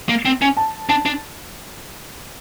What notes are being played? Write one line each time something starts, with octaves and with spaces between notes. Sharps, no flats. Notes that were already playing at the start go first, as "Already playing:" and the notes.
A#3
C4
C#4
A5
D4 A5
D4